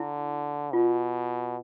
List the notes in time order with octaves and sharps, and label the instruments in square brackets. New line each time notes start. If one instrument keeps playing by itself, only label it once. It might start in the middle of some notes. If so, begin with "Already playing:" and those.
Already playing: [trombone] D3 [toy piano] E4
[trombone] B2 [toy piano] F4